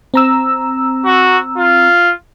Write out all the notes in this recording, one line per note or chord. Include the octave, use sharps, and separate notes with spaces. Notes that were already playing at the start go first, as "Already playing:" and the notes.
C4 A#5 E6
F#4
F4